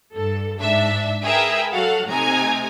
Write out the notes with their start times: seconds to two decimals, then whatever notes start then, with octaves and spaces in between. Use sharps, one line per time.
0.14 G2 A4
0.59 G#2 D4 E5 A5
1.23 G#4 A#4 B4 E5 G5 G#5
1.72 F#3 F#4 A4 F5 F#5
2.06 C3 A3 D#4 G#5 A#5